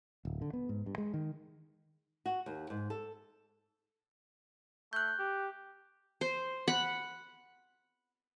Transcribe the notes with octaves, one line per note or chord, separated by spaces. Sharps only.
D1
D3
B3
G#2
G2
G#3
D#3
F#4
D#2
G#2
A4
A3 F#6 G6
G4
C5
F#5 B5